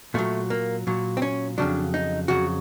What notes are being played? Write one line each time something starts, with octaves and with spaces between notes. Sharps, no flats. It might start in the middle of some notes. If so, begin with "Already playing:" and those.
A#2 F#3 A3
A#3
A#2 F#3
C4
C#4
F2 C#3 F#3 D4
D#4
F2 C#3 F#3 F#4